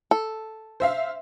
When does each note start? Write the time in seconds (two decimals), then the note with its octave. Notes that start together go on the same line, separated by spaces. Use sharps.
0.11 A4
0.80 C5 E5 F5